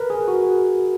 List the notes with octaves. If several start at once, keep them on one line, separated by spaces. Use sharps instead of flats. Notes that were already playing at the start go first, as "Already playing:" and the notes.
Already playing: A#4 B4
G#4
F#4